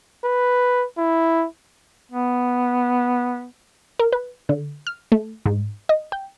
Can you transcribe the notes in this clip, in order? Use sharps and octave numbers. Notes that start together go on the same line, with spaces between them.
B4
E4
B3
A#4
B4
D3
F6
A3
G#2
D#5
G5